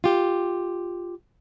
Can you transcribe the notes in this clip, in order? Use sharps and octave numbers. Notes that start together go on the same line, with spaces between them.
F4 G4